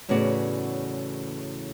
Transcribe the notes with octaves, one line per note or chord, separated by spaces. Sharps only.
E2 A2 C#3 B3 F#4 D5